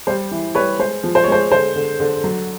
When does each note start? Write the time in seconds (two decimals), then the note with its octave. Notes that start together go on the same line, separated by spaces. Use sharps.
0.07 G3 C5
0.31 E3
0.55 G3 B4 C#5
0.79 G#3 C5
1.04 F3
1.15 C5
1.24 C#5
1.28 G#3 C5
1.52 D3 C5
1.76 D3
2.00 D3
2.24 F#3